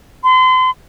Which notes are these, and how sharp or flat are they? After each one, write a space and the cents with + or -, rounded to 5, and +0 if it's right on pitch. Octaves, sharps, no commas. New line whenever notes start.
C6 -35